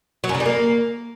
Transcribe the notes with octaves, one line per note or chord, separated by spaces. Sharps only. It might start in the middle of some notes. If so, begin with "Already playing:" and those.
F#3
F#2
C#3
G3
A#3